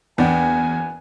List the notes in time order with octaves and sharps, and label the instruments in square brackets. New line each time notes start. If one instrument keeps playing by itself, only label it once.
[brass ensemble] F#1 G#5 [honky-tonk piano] E2 [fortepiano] B3 D4 G5